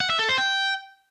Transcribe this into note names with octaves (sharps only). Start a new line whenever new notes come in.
F#5
E5
A4
C5
G5